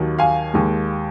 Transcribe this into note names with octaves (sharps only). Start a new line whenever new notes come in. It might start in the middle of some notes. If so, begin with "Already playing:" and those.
Already playing: D#2 D#3 F#3
F5 G#5
D#2 D#3 G#3